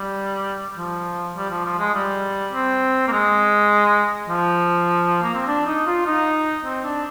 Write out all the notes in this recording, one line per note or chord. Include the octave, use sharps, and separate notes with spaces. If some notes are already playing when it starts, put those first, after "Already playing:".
Already playing: G3
F3
G3
F3
F3
G#3
G3
C4
A#3
G#3
F3
A#3
C4
D4
D#4
F4
D#4
C4
D4